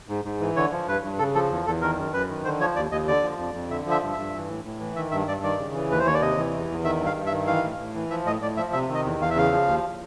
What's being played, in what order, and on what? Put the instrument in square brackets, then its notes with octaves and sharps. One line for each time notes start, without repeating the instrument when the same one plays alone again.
[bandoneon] G#2
G#2
E3
D3 C#5
F3
G2 B4
G2
C#3 A4
F3 A4
E2
E2 A4
D#3 A#4
F#2
F#2 B4
D#3
D3 C5
F3 C#5
D#2 D5
D#2 D#5
D3 D5
F3
F2
F2
D3 E5
F3
E5
G2
G2 E5
E3
A2
A2
E3
D#3 E5
G2 E5
G2 D5
D#3 D5
C#3
E3
D#2 B4
C5
D#2 C#5
D5
C3 D#5
E3
E2
E2
D#3 E5
G2
F5
G2
E5
D#3
E3 F5
A2
A2
E3
F3 E5
A2 D#5
A2 D5
F3 E5
C3 E5
D#3
D#5
E2
E2 F5
E5
C#3 F5
F3
D#2